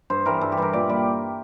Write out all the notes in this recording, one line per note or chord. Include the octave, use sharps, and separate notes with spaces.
G2 C5
E3 G3 A#4
G2 A4
G4
E3 G3 A#4
A#2 D5
G3 D5